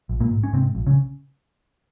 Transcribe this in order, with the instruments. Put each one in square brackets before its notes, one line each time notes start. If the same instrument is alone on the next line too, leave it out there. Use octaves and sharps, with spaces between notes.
[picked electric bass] A#1
A#2 A#3
G#2
C#4
G#2 C3 C4
A#1
C#3 C#4